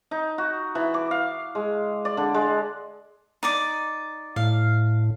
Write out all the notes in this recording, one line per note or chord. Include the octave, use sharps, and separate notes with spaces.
D#4
F#4
E3
D6
F5
G#3
D5
D3
G#3
D#4 D5 D6
A2 F5